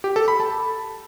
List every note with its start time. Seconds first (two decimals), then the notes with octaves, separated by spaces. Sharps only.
0.04 G4
0.16 A4
0.28 B5
0.40 A5